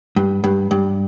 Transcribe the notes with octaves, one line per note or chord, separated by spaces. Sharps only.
G2
G2
G2